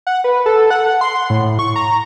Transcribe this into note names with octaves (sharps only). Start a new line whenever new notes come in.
F#5
B4
A4
F#5
C6
A2
C#6
A#5